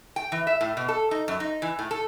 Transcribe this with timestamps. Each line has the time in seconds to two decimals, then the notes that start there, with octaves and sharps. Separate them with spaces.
0.16 G5
0.32 E3
0.47 E5
0.61 A2
0.77 B2
0.88 A4
1.11 D#4
1.28 F#2
1.40 D#4
1.62 E3
1.79 A2
1.91 A4